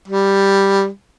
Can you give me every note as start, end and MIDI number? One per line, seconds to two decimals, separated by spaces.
0.08 0.87 55